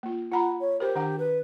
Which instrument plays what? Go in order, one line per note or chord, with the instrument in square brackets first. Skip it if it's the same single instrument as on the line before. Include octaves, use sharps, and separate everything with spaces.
[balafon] A#3 F4
[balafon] F4 A#5 B5 [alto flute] F#5
[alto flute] C#5
[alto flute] G4 [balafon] A#4 C5
[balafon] D#3 D4 F#5
[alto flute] B4